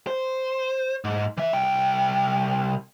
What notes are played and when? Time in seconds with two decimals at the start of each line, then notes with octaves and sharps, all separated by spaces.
0.07 C5
1.05 G#2
1.38 E3 E5
1.53 C2 G5